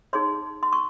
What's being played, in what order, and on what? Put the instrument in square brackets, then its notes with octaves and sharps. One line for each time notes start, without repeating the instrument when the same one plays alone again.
[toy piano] D#4 G#4 C#5 C6
C6
C#6